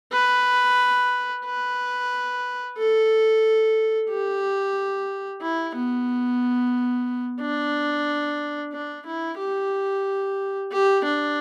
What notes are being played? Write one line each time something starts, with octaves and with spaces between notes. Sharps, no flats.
B4
B4
A4
G4
E4
B3
D4
D4
E4
G4
G4
D4